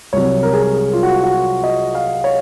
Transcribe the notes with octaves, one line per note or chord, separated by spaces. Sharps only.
C2 C3 F#3 C#5
A#4
G#4
A#4
G#4
F4
F#4
F#4
F4
D#5
F5
C#5